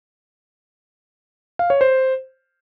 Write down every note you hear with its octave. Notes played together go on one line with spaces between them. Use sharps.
F5
C#5
C5